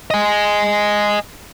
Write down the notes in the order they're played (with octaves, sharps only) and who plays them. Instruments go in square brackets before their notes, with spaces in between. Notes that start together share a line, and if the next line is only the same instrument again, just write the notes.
[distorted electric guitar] D#5 G#5